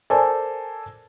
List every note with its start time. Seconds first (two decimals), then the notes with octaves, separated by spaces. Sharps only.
0.10 A4 A#4 C5 D5 G#5 A5